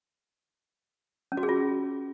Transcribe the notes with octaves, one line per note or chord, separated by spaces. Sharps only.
C#4
F#4
G#4
F4